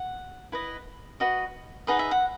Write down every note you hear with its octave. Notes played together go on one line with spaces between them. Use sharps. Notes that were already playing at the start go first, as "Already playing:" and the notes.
Already playing: F#5
E4 B4 D#5
F#4 B4 D#5
D#4 G#4 B4 D#5 F#5
E5
F#5